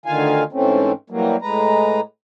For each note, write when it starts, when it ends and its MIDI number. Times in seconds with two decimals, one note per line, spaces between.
0.06 0.44 38
0.06 0.44 50
0.06 0.44 51
0.06 0.44 65
0.06 0.44 77
0.06 0.44 80
0.53 0.92 44
0.53 0.92 52
0.53 0.92 57
0.53 0.92 60
0.53 0.92 61
1.10 1.36 52
1.10 1.36 54
1.10 1.36 55
1.10 1.36 58
1.42 2.01 45
1.42 2.01 56
1.42 2.01 71
1.42 2.01 82